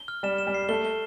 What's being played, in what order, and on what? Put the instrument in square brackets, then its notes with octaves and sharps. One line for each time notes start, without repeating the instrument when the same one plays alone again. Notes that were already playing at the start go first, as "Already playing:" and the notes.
Already playing: [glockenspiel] G7
F6
[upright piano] G3 [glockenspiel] E7
[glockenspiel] E7
[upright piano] G3
[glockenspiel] C7
[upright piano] A3 [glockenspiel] G7
[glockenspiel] G7